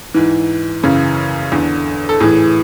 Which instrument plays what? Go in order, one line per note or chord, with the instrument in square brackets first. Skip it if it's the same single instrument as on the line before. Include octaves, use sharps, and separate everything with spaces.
[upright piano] G#2 E3
F#2 C#3 E3
E2 D3
A4
A2 E3 G#4